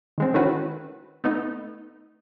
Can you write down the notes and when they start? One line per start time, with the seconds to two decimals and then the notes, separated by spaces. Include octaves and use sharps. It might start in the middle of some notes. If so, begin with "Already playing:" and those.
0.18 D#3 G#3 C4
0.34 D#3 A3 C#4 E4 F#4 B4
1.24 A3 B3 D#4